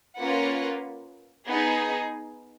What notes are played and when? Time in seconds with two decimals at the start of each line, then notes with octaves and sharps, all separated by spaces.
0.20 A#3 C#4 F4 B4 F#5
1.49 B3 D#4 G#4